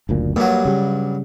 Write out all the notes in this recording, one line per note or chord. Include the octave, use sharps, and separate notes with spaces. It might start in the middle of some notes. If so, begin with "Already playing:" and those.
F#1 D2 A#2
G2 F#3 A#3
C#3 G3